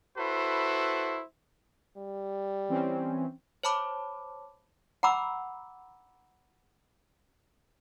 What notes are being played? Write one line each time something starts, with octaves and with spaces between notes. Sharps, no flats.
E4 F#4 A4 B4 C5
G3
E3 C4 C#4
C5 C#5 A5 B5 D6
F#5 A#5 B5 D6 E6